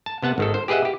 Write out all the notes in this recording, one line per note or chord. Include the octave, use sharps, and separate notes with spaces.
A5
C3 B3 F#5 A5
G#1 D#3 A4
C5
G4 G#4 B4 D#5 E5 F#5
G4